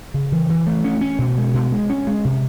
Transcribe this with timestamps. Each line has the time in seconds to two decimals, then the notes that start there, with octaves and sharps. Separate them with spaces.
0.14 C#3
0.32 E3
0.50 E3
0.67 A3
0.84 C#4
1.01 C#4
1.19 B2
1.37 G#3
1.54 B2
1.72 G#3
1.90 C#4
2.07 G#3
2.25 C3